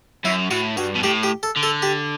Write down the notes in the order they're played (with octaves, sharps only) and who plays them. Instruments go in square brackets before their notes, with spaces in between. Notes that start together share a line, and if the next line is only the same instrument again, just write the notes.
[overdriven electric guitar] F#2 [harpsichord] E4
[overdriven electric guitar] A2 [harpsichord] F#4
[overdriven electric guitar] G2 [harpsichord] F#4
[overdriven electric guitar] B2
[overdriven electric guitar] A2 [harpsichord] G4
[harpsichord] G4
A4
[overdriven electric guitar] D3
[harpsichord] A4
G4